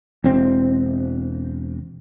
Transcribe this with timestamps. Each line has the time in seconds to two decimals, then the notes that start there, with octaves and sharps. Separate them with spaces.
0.24 E1 C4